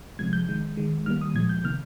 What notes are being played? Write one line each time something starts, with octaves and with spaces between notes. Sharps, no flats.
C3 F3 G#3 G#6
G6
D#3 G#3
D#3 G#3
D#3 G3 A#3 F6
D#6
A#2 F3 G#3 G#6
G6
C3 D#3 A#3 F6